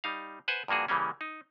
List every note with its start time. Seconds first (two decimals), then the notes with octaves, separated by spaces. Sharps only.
0.04 G3 D#4 F5
0.48 B4 C5 F#5 G#5
0.68 G2 F3 A#3 F#4 G#4
0.88 C#3 E3 G3 A#3 C#4
1.21 D#4